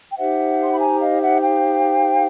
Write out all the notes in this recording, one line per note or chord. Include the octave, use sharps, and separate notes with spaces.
G5
D#4 G4 C5 E5 F#5
C6
B5
G#5 A#5
D#5 F5
E5 F#5
F5 G5